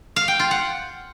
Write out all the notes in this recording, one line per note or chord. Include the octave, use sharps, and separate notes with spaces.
F5
G5
F4
F#5